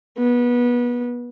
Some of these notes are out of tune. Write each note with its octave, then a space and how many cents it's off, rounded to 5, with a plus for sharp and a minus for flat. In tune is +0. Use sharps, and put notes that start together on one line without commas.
B3 -25